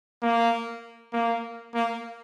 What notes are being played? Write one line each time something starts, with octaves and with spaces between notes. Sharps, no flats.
A#3
A#3
A#3